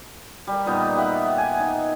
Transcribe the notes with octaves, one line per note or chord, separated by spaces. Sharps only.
G3 A#4
A#2 B3 D#4
G4 E5 F#5
G#5
D#4